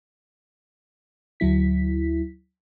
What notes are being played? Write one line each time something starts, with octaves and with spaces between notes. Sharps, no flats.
D2 F#3 E4 B6